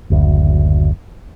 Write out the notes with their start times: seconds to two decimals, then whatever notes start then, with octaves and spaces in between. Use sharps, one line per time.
0.10 F#1 D2